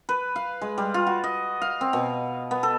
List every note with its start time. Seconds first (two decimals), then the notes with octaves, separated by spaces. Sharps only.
0.09 B4
0.36 F5
0.61 G#3
0.78 G3
0.94 F4
1.07 F#4
1.24 D#5
1.62 F5
1.81 C4
1.93 B2
2.51 B3
2.63 A4